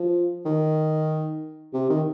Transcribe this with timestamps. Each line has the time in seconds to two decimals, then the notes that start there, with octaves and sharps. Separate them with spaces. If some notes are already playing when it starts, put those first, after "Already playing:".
Already playing: F3
0.46 D#3
1.74 C3
1.90 D#3